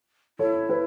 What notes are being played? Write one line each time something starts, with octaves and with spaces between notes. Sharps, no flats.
E4 A4 C#5
B4